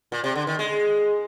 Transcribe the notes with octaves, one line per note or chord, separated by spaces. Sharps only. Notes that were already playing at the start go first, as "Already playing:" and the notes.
A#2
C3
D3
D#3
G#3